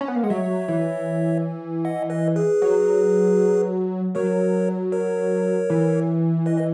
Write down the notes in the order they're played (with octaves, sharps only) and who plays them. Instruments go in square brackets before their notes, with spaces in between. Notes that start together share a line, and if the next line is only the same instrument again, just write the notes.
[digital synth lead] C#4
B3
A#3
[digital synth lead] G#3 [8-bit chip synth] F#5
[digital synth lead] F#3 [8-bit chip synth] C#5 E5
[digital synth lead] E3
[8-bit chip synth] D#5 F#5
B4 D#5
G#4 B4
[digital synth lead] F#3
[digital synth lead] F#3 [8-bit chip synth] A#4 C#5
[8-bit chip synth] A#4 C#5
[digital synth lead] E3
[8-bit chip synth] B4 D#5
D#5